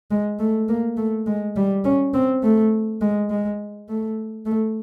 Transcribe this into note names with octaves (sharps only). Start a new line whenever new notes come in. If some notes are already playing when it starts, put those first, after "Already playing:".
G#3
A3
A#3
A3
G#3
G3
C#4
C4
A3
G#3
G#3
A3
A3